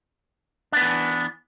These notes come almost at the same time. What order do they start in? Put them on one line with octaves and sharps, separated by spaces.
D4 B3 E3